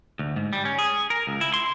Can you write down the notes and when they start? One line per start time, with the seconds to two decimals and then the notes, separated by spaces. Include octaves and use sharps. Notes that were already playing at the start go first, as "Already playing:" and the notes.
0.19 D2
0.36 G#2
0.53 G3
0.65 C#4
0.79 G#4
1.10 A#4
1.27 C#2
1.41 E4
1.54 C6